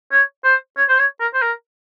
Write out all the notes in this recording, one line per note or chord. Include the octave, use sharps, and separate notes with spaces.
C#5
C5
C#5
C5
C#5
A#4
C5
A#4